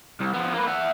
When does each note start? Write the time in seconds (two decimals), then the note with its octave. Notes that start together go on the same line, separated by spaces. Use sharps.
0.20 C2
0.33 F3 B3
0.54 A#3 B4
0.68 E5 F#5